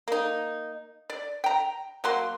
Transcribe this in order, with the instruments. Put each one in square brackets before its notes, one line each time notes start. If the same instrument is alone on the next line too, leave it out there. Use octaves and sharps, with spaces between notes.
[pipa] A#3 D#4
D5
G5 A#5
F#3 A#3 C6